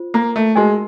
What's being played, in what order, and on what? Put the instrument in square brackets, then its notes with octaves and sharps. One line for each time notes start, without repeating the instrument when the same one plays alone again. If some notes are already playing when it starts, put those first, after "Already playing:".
Already playing: [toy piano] F4 C5
[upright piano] A#3
A3
[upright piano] G#3 [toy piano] D#4 F#4 A#4 D#5 G#5